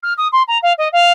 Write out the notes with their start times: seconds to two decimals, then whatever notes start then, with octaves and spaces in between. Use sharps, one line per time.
0.03 F6
0.18 D#6
0.32 C6
0.48 A#5
0.63 F5
0.78 D#5
0.93 F5